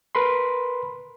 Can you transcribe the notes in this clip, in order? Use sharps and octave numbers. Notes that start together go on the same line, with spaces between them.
A#4 B4 B5 C6